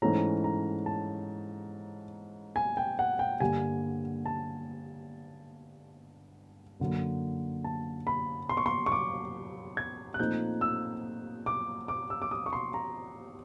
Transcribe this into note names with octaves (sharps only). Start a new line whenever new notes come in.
G#2 E3 A3 C#4 E4 A#5
A#5
A5
G#5
G5
F#5
G5
G2 D3 G3 A#3 G#5
A5
F#2 D3 F#3 A#3
A5
B5
C6
C#6
C6
C#6
D6
G#6
F#6
A#2 F3 A3 C4 D#4 G6
E6
D6
D6
E6
D6
D#6
C#6
C6
A#5